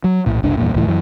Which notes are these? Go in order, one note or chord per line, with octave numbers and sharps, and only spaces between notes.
F#3
A#1 A2
F#1 C2 D4
E2 G2 A#2
D1 C#2 A2 E3
F#2 E3